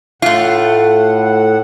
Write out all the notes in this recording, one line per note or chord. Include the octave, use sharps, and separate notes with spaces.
A2 A3 F4 F#5